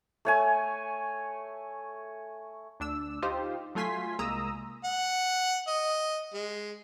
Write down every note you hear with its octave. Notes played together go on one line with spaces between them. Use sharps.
A3 C#5 G#5
D2 D4 E6
D#4 F4 G4 C5
F#3 A3 F4 G#5 C6 B6
C2 G#3 A#3 A#5 D#6 E6
F#5
D#5
G#3